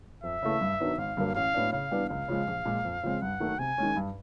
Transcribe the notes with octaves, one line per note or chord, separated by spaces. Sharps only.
F2 E5
C#3 E3 A3
G2
D#3 F#3 B3 D4
G#1 F5
G2 D3 F#3 A#3
A1 F5
A2 F#3 B3 D4
C#3 F5
E3 G3 B3 D4
C#2 F5
C#3 F3 G#3
A#1
A#2 F3 G#3
F2
C#3 F3 G#3 C4
G2 F#5
D#3 F#3 A3
C3 G#5
D#3 G#3 C#4
G2